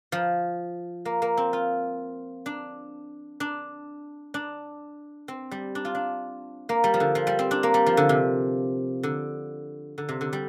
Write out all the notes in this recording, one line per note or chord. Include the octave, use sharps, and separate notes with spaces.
F3
A#3
A#3
C4
F4
D4
D4
D4
C4
G3
D4
F4
D4
A#3
G3
F3
D3
F3
G3
C4
D4
A#3
G3
F3
D3
C3
D3
D3
C3
D3
G3